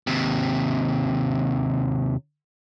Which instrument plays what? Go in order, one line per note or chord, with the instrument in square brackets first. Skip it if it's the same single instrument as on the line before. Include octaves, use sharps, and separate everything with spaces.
[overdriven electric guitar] D#2 C3